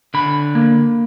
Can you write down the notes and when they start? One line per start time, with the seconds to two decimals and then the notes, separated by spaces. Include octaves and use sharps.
0.14 D3 B5
0.55 A#3